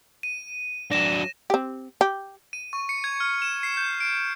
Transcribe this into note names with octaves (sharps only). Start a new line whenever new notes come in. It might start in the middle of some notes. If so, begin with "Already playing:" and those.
D#7
F#3 D4 A#6 E7
C4 G4
G4
D#7
C#6
C#7
G#6
F6
E7
C7
G6
D7